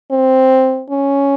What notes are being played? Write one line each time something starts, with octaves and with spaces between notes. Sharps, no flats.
C4
C#4